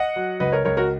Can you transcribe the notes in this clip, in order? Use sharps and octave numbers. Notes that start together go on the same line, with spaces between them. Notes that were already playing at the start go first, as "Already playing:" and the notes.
Already playing: D#5 F#5
F#3
C#2 B4 D#5
A#4 C#5
C#2 A#4 C#5
F#4 A#4